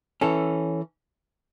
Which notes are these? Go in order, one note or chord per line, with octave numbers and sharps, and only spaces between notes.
E3 C#4 A4